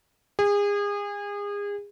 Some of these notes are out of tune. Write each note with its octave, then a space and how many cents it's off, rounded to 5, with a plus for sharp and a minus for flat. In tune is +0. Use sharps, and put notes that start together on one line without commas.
G#4 -30